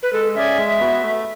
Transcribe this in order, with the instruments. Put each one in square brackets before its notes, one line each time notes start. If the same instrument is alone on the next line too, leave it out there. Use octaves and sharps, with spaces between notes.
[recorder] B4
[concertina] G#3 [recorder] A4
[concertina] C#4 G#4 D5 G#5 [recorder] E5
[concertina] G#3
B3 F#4
A3